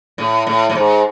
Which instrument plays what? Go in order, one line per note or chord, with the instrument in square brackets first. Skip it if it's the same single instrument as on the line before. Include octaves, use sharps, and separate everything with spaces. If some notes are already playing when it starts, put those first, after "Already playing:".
[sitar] A2
A2
A2
G#2